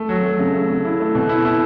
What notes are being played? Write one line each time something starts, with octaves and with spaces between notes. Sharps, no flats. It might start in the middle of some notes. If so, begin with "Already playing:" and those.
Already playing: A3
F#3
A3
C#3
A3
C#3
E4
A3
B2
E4
E4